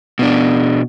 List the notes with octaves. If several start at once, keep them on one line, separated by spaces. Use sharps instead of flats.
B2 D4